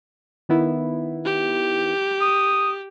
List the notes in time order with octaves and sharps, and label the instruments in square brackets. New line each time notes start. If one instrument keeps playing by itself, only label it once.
[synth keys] D#3 B3 E4
[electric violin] G4
[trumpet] D#6